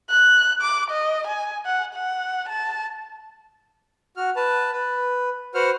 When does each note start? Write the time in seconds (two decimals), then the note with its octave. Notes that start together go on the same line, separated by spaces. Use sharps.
0.11 F#6
0.62 D6
0.91 D#5
1.27 G#5
1.65 F#5
1.94 F#5
2.49 A5
4.17 F#4 F6
4.36 B4 A5
4.72 B4
5.55 F#4 B4 C5 F#5 F6